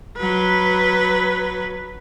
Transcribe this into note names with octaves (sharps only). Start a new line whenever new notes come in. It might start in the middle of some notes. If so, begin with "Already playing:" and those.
F#3 B4